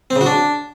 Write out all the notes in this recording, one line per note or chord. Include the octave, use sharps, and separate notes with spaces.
C4
C#3
F#4
D4